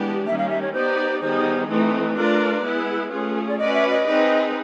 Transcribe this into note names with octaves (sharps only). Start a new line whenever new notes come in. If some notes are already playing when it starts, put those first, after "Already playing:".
Already playing: E3 G#3 B3 D4 G4
D#3 G3 A#3 C#4 E5
F5
E5
C#5
B3 D#4 G4 B4 C5 D5
D#3 G3 B3 D#4 G#4 C5
E3 A3 C4 D#4 B4
A3 D4 F4 A#4 D5
G#3 B3 E4 G#4
A3 C#4 F4 G#4
D5
C#4 F#4 B4 D5 D#5
E5
D#5
C4 D#4 G#4 B4